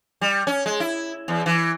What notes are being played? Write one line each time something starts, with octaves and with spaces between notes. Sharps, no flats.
G3
C#4
G#3
E4
E2
E3